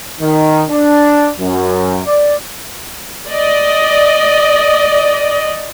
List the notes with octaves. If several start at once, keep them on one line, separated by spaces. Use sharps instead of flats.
D#3
D4
F#2
D5
D5 D#5